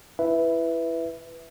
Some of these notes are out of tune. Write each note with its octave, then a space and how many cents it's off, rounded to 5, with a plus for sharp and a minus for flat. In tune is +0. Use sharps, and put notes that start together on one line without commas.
E4 +15 B4 +0 E5 +0